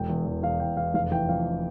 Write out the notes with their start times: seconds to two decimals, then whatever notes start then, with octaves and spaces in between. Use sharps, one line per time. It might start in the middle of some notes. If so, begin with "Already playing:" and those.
Already playing: E1 G5
0.10 E2
0.26 E2
0.43 E2 F5
0.60 E1 G5
0.77 E2 F5
0.94 F1 F5
1.12 E3 G5
1.29 F2 F5